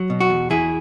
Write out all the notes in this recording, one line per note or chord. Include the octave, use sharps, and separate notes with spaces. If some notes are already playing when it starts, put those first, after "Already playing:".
Already playing: F#3
B2
F#4
E2
E2 E4 G#4